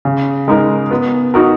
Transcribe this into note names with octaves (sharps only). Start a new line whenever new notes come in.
C#3
G#3 D#4 A#4
B3
D#4 F#4 A#4